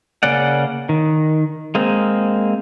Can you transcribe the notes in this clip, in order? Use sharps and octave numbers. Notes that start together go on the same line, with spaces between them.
C#3 A#3 C#4 D5 F#5
D#3
G#3 A#3 C4